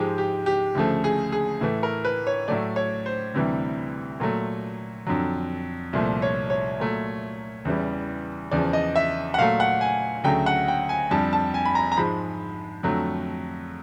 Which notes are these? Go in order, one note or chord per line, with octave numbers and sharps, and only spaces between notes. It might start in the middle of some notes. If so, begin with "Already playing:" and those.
Already playing: G#2 F3 G#3 G4
G4
G4
D2 C#3 F3 A3
G#4
G#4
A2 E3 A3
A#4
B4
C#5
A2 F#3 A3 D5
C#5
C5
D2 C3 E3 G3
A#2 F#3 A3
F2 D3 F#3
C2 A#2 F3 A3
C#5
C#5
A#2 F#3 A3
E2 C#3 E3 G3
E2 C#3 F3 D5
D#5
E5
F#5
A#2 F#3 A3 F5
F#5
G#5
D2 C#3 F#3 A3 G5
F#5
G5
G#5
F2 D3 G3 A5
A5
G#5
B5
A#5
A#5
G#2 F3 G#3 B5
F2 D3 F#3 A3